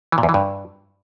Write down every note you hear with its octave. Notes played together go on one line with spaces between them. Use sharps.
E3
A#2
E2
E3
G2